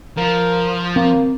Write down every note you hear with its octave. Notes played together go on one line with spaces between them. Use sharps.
F3 A#4
A#3 C4